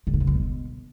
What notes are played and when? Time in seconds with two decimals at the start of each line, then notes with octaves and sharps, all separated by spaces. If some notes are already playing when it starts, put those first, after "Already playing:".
0.07 D3
0.14 C3
0.20 C#3
0.27 F#2
0.34 B2